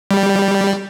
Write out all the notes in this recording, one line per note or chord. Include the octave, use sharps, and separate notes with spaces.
G3